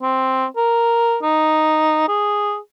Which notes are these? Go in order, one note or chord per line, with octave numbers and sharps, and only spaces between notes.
C4
A#4
D#4
G#4